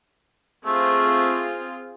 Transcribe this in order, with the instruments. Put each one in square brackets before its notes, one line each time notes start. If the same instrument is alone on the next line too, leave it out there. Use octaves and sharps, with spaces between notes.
[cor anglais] A3 [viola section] C4 F4 G#4